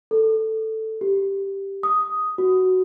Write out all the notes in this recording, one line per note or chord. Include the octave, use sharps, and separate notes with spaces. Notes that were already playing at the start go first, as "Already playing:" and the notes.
A4
G4
D#6
F#4